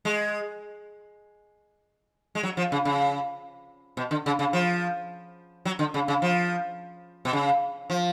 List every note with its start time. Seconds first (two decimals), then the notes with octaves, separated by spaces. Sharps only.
0.05 G#3
2.35 G#3
2.43 F#3
2.57 F3
2.72 C#3
2.85 C#3
3.97 B2
4.11 D3
4.26 C#3
4.39 C#3
4.53 F3
5.65 F#3
5.79 D3
5.94 C#3
6.08 C#3
6.22 F3
7.25 B2
7.33 C#3
7.90 F3